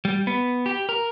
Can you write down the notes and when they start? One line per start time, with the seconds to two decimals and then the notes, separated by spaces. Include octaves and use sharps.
0.05 G3
0.27 B3
0.66 G4
0.89 A#4